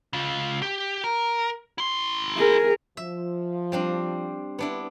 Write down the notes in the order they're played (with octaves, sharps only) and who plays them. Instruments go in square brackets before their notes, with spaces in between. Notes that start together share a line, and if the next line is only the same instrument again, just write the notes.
[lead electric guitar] C#3 F4
G4
A#4
E4 C6
[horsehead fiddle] G#4 A#4
[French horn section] F3 [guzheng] E5
[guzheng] G3 C4 D4
[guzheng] B3 D4 E4 [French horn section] B4